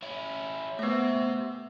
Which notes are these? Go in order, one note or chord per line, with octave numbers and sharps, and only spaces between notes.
C#4 E4
A3 B3 C5 E5